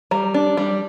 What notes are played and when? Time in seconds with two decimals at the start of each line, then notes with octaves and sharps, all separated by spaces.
0.11 G3 A#5
0.34 D4
0.57 G3